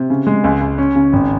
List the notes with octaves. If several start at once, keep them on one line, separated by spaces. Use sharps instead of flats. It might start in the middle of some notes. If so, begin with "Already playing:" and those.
Already playing: C3
C#3
G#3
C#2
C#2
C#4
C#3
G#1